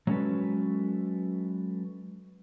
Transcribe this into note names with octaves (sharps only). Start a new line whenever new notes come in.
F#3 G#3 C#4 F#4 A4 B4